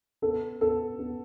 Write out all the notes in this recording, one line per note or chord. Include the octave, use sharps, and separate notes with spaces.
B3 A4
B3 A4
B3